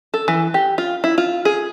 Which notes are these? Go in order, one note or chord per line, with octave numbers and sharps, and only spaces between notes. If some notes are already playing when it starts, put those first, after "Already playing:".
A4
E3
G4
F4
E4
F4
G#4